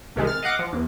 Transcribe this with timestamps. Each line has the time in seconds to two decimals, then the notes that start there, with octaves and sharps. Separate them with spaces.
0.16 C2 C3 D#3 G#3
0.27 F6 A6
0.43 D#5 F5 F#5 D6
0.59 F3
0.73 E2